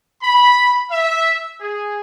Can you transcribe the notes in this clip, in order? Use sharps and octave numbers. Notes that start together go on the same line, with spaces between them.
B5
E5
G#4